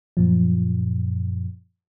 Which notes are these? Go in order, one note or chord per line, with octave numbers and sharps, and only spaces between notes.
F#2 A#2 F3